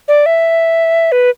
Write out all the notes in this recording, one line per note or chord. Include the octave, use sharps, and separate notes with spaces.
D5
E5
B4